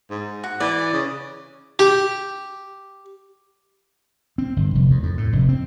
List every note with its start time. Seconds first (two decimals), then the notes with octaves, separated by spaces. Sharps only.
0.10 G#2
0.44 F#4
0.60 E3 D5
0.93 C#3
1.79 G4
4.38 C4
4.56 G1
4.75 F1
4.90 E2
5.03 F2
5.17 A2
5.33 F1
5.49 C4